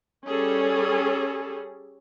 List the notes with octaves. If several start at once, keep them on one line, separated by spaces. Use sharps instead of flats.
G3 C#4 G#4 A4